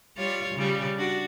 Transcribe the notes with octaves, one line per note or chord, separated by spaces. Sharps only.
G3 F4 C#5
C#3 G3
D4 F#4